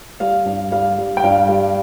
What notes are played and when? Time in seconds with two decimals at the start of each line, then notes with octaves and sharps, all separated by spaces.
0.20 G3 F5
0.46 G2
0.72 G3 F5
0.98 G3
1.17 G5
1.23 G2 F5
1.49 G3